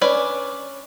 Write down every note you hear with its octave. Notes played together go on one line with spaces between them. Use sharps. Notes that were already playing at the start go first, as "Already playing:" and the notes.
C#4 D4 B4 D5 G#5